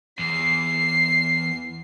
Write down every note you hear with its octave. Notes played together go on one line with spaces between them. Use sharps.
E2 C7